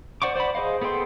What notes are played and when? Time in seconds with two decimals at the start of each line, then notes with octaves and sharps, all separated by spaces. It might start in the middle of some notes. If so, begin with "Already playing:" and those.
0.22 C5 D5 F#5 C#6 D6
0.36 C5 D5 F#5 B5
0.55 G#4 C5 D#5 F5
0.82 B3 G#4 A4 G5 C6